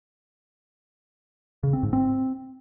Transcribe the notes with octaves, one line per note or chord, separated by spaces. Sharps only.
C#3
C4
G#2
C4